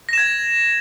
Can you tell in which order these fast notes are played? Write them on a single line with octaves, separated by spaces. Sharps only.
A#6 E7 G#6